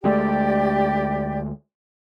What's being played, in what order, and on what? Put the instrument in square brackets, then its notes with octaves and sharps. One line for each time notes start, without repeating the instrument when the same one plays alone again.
[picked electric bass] D2 G#3 A3 [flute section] G4 D5